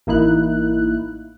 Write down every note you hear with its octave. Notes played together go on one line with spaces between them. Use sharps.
A1 A#3 D#4 E4 F#6